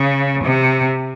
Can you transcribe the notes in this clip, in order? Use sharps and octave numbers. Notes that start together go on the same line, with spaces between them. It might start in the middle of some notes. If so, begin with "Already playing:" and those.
Already playing: C#3
C3